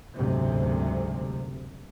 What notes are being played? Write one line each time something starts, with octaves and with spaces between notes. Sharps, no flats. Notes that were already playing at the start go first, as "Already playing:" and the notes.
F#1 D2 G#2 C3